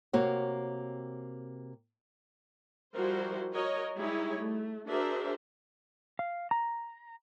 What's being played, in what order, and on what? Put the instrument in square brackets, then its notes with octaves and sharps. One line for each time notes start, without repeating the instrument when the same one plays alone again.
[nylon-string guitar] C3 A#3 F#4 C#5
[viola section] F3 G3 E4 F#4 A#4 C5
F#4 A#4 C#5 D#5
G3 G#3 D#4 E4 G#4 C#5
A3
D4 F#4 G#4 A#4 C5 E5
[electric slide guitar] F5
A#5